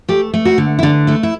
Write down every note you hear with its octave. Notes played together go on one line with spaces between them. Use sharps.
A3 G4
A3
F#4
D3
E4
D3 D4
A3 E4
E4